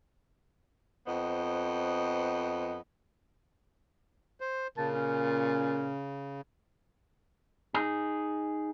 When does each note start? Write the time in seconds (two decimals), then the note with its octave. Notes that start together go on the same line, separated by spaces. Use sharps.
1.06 F2 B3 C5 D#5
4.41 C5
4.77 A#2 C#3 A5
4.94 C#4
7.74 D#4 G#4